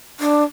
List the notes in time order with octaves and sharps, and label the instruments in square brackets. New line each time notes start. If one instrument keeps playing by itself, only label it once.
[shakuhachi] D4